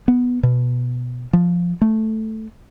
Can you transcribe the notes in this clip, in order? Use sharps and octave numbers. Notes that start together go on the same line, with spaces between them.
B3
B2
F3
A3